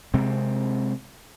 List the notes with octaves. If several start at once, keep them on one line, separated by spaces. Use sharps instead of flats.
C3 G#3 C4